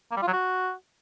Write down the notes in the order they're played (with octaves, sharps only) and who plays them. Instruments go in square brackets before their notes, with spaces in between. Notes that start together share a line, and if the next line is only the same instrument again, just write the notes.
[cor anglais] A#3
G3
F4
F#3
F#4